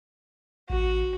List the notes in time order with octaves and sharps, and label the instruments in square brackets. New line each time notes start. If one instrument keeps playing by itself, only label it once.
[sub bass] A1 [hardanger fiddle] F#4